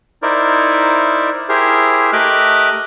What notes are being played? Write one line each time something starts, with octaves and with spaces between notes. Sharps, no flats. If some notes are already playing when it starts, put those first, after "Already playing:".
D#4 E4 A#4 C5 D5
E4 G4 G#4 A#4 C5
A3 G4 A#4 D#5 D6 F#6